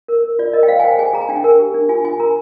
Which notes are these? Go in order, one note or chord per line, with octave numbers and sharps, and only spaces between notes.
A#4
A#4
F4 D5
A#4 D#5
G5
C5 F5
G#5
C5 G5
G5
G#4 G#5
G#4 A#5
G#5
D4 G5
G#5
A#4
G4
D4
F4 G#5
F4 G#5
A#4 A#5